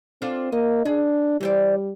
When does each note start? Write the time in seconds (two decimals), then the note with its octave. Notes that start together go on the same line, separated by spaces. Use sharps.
0.22 C4 D4 F4 A4
0.52 A#3 D#5
0.85 D4 G#4
1.41 E3 G3 C5 D5